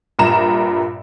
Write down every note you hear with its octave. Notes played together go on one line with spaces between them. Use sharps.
A#1 G2 A#2 A#5 E7